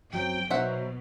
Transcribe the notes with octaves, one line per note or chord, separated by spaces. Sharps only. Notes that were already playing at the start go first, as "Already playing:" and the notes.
F#2 F#3 C4 G5
B2 F#3 D#4 C5 E5 F#5